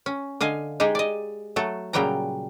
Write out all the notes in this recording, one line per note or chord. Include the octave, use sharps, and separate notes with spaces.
C#4
D3 D#5 F5 G#5
G#3 D#4 G4 G#4
D5 D#5
F#3 A3 A4
A#2 C#3 F#3 G3 G5 A#5